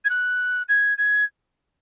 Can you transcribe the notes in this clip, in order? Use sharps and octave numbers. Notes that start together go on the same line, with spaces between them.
G#6
F#6
G#6
G#6